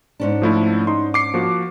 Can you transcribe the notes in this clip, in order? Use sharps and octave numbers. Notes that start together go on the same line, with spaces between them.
G#2 C#4 D4
F3 A3 E4
D#4 C6
D6 C7 C#7
F3 A#3 F#4